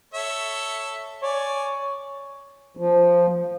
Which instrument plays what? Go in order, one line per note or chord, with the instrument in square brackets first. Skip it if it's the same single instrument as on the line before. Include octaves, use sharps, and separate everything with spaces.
[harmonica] A4 C#5 E5
[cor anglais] C#5 [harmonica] D5 G#5
[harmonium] F3